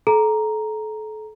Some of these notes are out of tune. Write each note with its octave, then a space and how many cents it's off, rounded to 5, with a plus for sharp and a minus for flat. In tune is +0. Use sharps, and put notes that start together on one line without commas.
A4 -35 A#5 +0